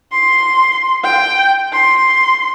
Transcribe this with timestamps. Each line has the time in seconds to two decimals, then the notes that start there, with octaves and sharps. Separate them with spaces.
0.12 C6
1.04 G5
1.73 C6